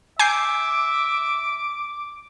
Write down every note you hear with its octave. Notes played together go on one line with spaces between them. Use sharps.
E5 G#5 D6 G6 C7